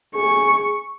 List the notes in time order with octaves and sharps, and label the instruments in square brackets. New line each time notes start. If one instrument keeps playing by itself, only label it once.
[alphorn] G#4 [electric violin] C#6